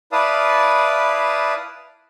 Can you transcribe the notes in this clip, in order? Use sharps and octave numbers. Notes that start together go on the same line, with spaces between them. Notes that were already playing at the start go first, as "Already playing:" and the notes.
E4 B4 D5 F5 A5 D#6